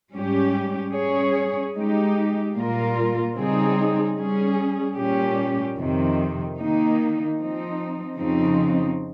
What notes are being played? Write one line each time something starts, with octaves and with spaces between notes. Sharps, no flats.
G#2 G3 C#4 G4
G3 C#4 G#4 C#5
G#3 D#4 G4
A#2 G3 A#3 F4 A#4
C#3 G3 C4 D#4 G#4
G3 C#4 G#4
A#2 G3 C#4 G4
F2 C3 D#3
D#3 A#3 D#4
F3 C4 D#4
F2 C#3 F3 C4 D#4